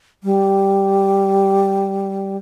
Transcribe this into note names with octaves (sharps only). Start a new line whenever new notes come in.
G3